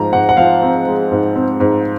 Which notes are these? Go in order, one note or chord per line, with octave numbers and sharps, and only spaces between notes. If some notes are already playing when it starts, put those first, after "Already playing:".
Already playing: G#2 F3 A#5
G#2 F#5
F#5
F3 F5
C4
G#3
G#2
C4
G#2